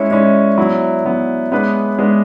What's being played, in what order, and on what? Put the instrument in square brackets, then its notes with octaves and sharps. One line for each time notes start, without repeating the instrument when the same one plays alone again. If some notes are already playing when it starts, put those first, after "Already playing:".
Already playing: [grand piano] G#3 C#4 E4 [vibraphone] C#5 E5
[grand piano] G#3 C#4 E4 [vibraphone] D5
[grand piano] F#3 B3 E4
F#3 B3 E4
G#3 B3 D4 G#4 B4
G#3 B3 D4 G#4 B4